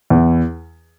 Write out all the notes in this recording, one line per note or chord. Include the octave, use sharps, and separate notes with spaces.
E2